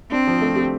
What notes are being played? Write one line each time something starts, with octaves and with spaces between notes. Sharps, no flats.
C4 D4
F3
A3
G4